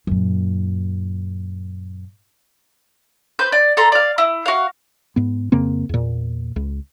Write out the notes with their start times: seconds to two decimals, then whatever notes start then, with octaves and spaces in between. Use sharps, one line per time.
0.07 F#2 A#2
3.39 B4 C5 G6
3.52 D5
3.77 A4 A#5 C6
3.92 D5 F5
4.18 E4
4.46 F#4 F5
5.16 G#2 B3
5.52 F2 C#3 A#3 C4
5.89 E2 A#2
6.56 C#2